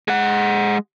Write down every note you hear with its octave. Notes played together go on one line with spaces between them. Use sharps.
G#3 F#5